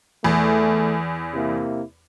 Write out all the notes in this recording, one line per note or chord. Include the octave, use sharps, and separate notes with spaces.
E2 A3
C3 A#3 E4